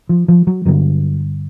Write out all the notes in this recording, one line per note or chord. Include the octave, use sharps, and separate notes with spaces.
F3
F3
F#3
G2 D3 F#3